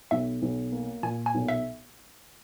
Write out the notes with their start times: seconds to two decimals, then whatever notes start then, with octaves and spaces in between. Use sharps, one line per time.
0.11 B1 E5
0.42 B1
0.72 A#3
1.03 A#2 G#5
1.26 G#5
1.34 B1
1.48 E5